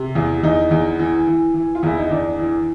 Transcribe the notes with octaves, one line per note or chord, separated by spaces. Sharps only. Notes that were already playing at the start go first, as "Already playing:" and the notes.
Already playing: C3
E2
E2 D#4
E2
E3
E3
E3
F4
E2 E4
D#4
E2 D4
E3